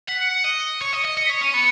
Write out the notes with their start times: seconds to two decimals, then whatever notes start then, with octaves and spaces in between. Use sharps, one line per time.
0.08 F#5 B6
0.20 C#7
0.33 C#7
0.44 D#5
0.80 C#5 C#7
0.93 D#5
1.05 D#5
1.17 D#5 C#7
1.26 B6
1.30 C#5
1.35 C#7
1.41 C#4 D#7
1.54 B3 C#7